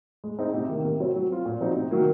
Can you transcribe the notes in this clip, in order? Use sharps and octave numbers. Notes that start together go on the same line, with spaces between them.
G#3
C4 D#4 G#4 D#5
C3
D#3 A#3
C3
F#3 C4 F#4 C#5
F#3
C4 F4
A#2
F3 C4 D#4 F#4
C3
D#3 F#3 A#3